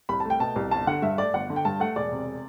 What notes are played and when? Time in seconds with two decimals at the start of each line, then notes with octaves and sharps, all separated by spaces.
0.09 C2 B5
0.20 A3 A5
0.30 G5
0.40 B2 A5
0.56 C2
0.71 G1 A5
0.87 D3 F#5
1.02 G2 E5
1.18 A3 D5
1.34 G1 F#5
1.50 D3
1.56 G5
1.65 G2 A5
1.80 A3 F#5
1.96 E1 D5
2.12 C3